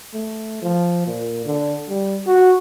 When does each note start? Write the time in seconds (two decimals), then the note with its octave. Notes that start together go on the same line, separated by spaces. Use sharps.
0.14 A3
0.62 F3
1.07 A#2
1.46 D3
1.89 G3
2.27 F#4